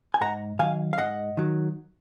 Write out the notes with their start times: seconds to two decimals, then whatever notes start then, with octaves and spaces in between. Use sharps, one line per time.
0.14 G#5
0.21 G#2 F#5 A#5
0.59 D#3 F#3 F5 G#5
0.93 F5
0.98 G#2 D#5 F#5
1.37 D#3 F#3